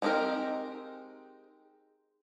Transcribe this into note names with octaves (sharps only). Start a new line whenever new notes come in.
G#3 C4 D#4 G4 A#4